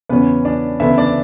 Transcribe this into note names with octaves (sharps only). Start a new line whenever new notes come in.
E2 C#3 F#3 B3 C#4 B4
D4 D5
D2 C#3 E3 B3 E4 E5
D4 D5